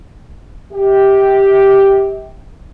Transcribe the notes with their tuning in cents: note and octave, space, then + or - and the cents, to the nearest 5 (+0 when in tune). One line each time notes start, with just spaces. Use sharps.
G4 +0 E5 -40